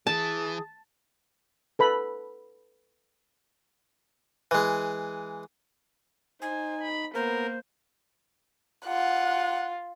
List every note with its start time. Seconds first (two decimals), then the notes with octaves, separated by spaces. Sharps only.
0.07 E3 G#4 A5
1.79 A4 B4 B5
4.51 E3 G#3
6.42 D#4 C5 G#5
6.82 B5
7.15 A#3 B3 A#4 C5
8.87 F4 F#5